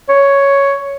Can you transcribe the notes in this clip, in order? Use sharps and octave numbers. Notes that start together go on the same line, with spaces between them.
C#5